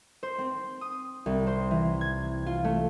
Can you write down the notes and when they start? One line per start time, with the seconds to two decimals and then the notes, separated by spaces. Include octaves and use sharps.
0.23 C5
0.38 C4
0.81 D#6
1.26 C2
1.47 C5
1.71 E3
2.01 G#6
2.46 F4
2.64 A3